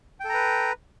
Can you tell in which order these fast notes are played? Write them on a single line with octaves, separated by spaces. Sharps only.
G5 A4 A#5 B4